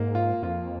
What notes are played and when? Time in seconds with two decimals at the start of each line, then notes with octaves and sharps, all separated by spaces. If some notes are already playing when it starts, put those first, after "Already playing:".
Already playing: G#2 A#3
0.15 F4
0.42 F2 F4